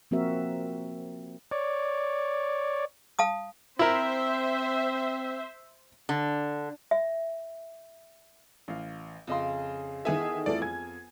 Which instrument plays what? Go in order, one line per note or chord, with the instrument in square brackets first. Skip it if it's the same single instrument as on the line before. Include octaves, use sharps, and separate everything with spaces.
[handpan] F3 A#3 C4 F#4 A#4 E5
[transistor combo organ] C#5 D5
[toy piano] F5 A5 D#6
[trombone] C4 [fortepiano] E4 A#4 [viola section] C5 E5
[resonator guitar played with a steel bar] D3
[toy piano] E5
[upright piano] A1 F5
[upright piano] F2 D#5 C6 [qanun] C#3
[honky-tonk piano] D#3 E3 A4 [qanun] B3 G#4 [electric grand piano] E5 G#5
[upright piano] F2 F4 [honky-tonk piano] E3 A3 A4 [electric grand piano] D5
[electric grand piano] G#5 [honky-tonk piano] G#6